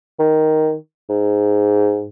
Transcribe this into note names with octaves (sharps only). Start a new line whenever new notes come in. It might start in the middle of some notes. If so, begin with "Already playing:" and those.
D#3
G#2